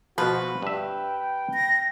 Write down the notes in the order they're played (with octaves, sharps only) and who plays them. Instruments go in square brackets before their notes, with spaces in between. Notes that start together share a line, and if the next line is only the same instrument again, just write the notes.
[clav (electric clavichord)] B2 F3 [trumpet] F#4 [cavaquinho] B4
[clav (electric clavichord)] G2 E5 [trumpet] G5
[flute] A#6